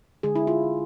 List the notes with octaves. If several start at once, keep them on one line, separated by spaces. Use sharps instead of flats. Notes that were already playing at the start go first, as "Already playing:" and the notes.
D3 G#3 G#4
E4
F4